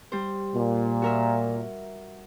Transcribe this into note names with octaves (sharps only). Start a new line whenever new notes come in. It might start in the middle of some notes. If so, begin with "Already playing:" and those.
G3 C5
A#2
F#4 A#4 E5